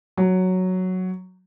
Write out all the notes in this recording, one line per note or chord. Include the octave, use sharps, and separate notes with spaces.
F#3